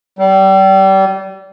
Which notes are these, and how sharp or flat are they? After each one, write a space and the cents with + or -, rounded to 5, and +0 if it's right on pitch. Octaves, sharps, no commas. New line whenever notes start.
G3 -30